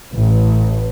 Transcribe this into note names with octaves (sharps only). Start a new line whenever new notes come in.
A1